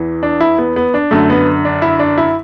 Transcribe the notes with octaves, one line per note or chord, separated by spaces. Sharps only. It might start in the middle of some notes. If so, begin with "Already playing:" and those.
Already playing: E2 E3
D4
E4
B3
B3
D4
F#2 D3 A3
B3
D4
E4
D4
E4